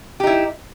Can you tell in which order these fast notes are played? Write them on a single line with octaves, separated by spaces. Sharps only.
G4 D#4 E4